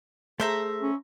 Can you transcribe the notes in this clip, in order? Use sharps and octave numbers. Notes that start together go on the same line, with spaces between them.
A3 G#4 C5 E5 A#5
C#4